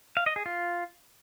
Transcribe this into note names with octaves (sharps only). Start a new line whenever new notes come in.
F5
D#5
G#4
F4